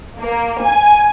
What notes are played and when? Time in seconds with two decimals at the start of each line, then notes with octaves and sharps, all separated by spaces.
0.18 A#3
0.62 G#5